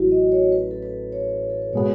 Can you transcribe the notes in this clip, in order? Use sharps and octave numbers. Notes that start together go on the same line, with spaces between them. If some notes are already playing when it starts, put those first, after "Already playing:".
Already playing: A1 A2 F#3 E4 F#4
D#5
C#5
B4
A4
B4
C#5
A4
B4
B2 G#3 B3 C#5